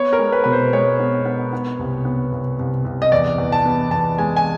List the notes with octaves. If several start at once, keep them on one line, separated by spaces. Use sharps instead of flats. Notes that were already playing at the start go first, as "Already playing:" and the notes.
Already playing: B3 C#5
A#4
G#3
B4
B2 B4
C5
G#3 C#5
B3
B3
B3
C2
B3
C2
C2
C2
D#5
E2 D5
E2
A5
B3
E2 A5
G#3 G#5
G#5